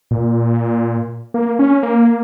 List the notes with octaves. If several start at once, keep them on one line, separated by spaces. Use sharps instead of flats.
A#2
A#3
C#4
A#3